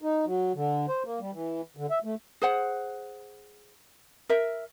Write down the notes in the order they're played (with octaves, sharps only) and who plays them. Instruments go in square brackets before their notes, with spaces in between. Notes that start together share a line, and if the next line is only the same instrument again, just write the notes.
[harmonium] D#4
F#3
D3
C5
A#3
G3
E3
D3
E5
A3
[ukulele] G#4 C5 F#5
A#4 E5